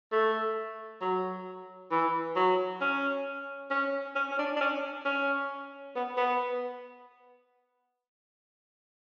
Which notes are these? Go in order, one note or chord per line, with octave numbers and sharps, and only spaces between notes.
A3
F#3
E3
F#3
C#4
C#4
C#4
C#4
D4
D4
C#4
C#4
B3
B3